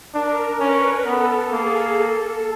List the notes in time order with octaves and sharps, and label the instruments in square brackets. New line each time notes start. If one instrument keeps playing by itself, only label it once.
[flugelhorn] D4 [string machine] A#4
[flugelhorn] C#4 [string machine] B4
[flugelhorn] B3 [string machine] A4
[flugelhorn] A#3 [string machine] G#4
[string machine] A4